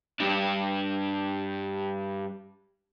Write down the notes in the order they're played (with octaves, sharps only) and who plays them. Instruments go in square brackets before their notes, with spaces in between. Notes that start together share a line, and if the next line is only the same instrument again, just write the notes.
[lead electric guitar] G2 D4